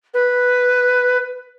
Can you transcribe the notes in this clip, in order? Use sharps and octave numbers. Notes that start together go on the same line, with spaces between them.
B4